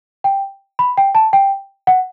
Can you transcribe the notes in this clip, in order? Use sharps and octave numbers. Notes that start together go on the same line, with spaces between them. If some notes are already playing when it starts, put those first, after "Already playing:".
G5
B5
G5
A5
G5
F#5